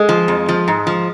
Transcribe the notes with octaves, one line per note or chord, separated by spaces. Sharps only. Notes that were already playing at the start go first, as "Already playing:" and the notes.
Already playing: G#3
F3
F2
F3
G#2
F3